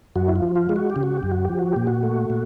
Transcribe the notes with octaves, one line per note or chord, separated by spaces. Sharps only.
F#2 F#4
E4
F4
F3
F4
G#3
F#4
G4
C#3
F#4
G4
F#2
F#4
F3 G4
F#4
A#2 G4
F#4
A3
A#2